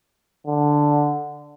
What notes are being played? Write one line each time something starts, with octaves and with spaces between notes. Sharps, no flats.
D3